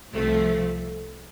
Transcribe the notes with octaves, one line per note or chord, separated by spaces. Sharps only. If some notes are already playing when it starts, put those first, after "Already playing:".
C2 C3 F3 A3